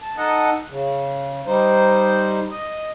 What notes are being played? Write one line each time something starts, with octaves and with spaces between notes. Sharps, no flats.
A5
D#4 A4 D#5 F#5 A5
C#3
G3 D#4 C5
D#5